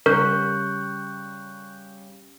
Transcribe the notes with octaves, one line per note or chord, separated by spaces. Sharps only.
C#3 G3 A#4 C#6 F#6 G6